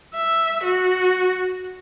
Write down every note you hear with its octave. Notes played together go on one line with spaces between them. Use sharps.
E5
F#4